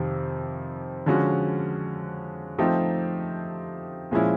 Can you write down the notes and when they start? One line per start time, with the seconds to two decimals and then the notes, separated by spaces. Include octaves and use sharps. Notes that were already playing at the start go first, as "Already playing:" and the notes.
Already playing: F2 C3 D#3
1.06 D3 F3 G#3 C#4 F#4
2.58 F3 A3 C4 D#4 G4
4.11 A#2 F3 G#3 C#4 E4